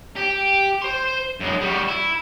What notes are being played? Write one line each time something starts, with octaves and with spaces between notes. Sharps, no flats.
G4
C5 C6
F#2 G#3
G3 F#4
E4